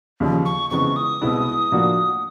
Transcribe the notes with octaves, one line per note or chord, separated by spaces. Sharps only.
D#2 C#3 F3
C#6
F2 C#3 E3 G#3 B3 C#6
D#6
C2 B2 G#3 B3 E4
A2 F3 A#3 D4 F#4